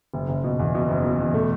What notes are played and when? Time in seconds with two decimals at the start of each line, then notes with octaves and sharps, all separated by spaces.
0.14 F#1
0.29 F#1
0.44 B2
0.59 E2
0.75 B2
0.88 F#1
1.04 B2
1.20 E2
1.34 A3